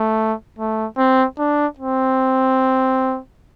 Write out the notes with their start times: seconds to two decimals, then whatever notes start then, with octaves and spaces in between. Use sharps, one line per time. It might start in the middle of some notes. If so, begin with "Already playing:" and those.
Already playing: A3
0.59 A3
0.98 C4
1.38 D4
1.79 C4